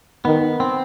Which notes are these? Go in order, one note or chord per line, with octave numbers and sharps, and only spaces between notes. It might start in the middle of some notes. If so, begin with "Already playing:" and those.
D#3 B3
C4